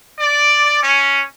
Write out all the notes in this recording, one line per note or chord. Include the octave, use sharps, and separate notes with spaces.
D5
C#4